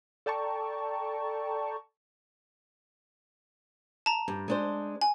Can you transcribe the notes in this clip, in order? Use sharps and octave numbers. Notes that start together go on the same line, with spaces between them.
A4 D5 G5 A5 A#5 C#6
A5 A#5
G2
G#3 D4 C5
G#5